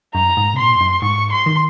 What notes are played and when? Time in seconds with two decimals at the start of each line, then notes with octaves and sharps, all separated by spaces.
0.14 F#2 A#5
0.37 G#2
0.54 C3
0.58 A#2 C6
0.76 F2
0.81 F#2
1.02 G#2 C#6
1.32 C6
1.46 D#3